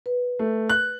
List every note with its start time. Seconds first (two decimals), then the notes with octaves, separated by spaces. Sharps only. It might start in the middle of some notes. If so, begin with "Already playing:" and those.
0.06 B4
0.39 A3
0.69 F#6